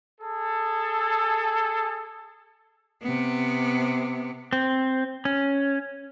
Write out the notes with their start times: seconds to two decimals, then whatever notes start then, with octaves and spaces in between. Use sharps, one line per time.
0.20 G#4 A4
3.02 C3 B3
4.53 C4
5.25 C#4